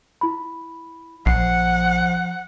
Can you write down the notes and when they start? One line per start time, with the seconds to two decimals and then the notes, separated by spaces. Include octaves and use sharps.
0.21 E4 B5
1.26 A#1 F3 F#5 C7